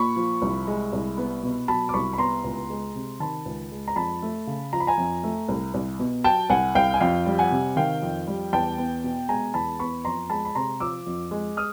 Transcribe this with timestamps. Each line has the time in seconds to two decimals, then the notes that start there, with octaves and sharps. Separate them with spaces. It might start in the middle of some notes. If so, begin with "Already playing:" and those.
Already playing: A#2 B5 C#6
0.16 F3
0.42 C2
0.67 G#3
0.93 C2
1.18 B3
1.43 B2
1.68 F#3 A5 B5
1.89 D6
1.94 C2 B5 C#6
2.13 B5
2.18 B3 A#5 C6
2.44 C#2
2.70 G#3
2.95 C3
3.20 D#3 A5 B5
3.46 C#2
3.71 G#3
3.88 A#5
3.96 F2 A5 B5
4.22 A3
4.47 C#3
4.73 F3 A#5
4.80 B5
4.87 G#5 A#5
4.98 F2
5.23 A3
5.49 C2
5.74 C2
5.99 B2
6.24 F#3 G5 A5
6.50 C2 F#5 G#5
6.75 C2 F5 G5
6.94 G#5
7.00 F2 F5 G5
7.26 G3
7.39 F#5 G#5
7.51 C3
7.76 D#3 F5 G5
8.02 F2
8.27 G3
8.53 E2 G5 A5
8.78 B3
9.04 B2
9.29 G#3 G#5 A#5
9.54 E2 A5 B5
9.79 B3 B5 C#6
10.04 F2 A#5 C6
10.30 G#3 A5 B5
10.45 B5
10.55 C3 A#5 C6
10.80 F3 D6 E6
11.07 F2
11.31 G#3
11.57 D#6 F6